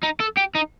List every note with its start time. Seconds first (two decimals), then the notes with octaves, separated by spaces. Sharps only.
0.03 D#4
0.20 A4
0.37 G4
0.55 D#4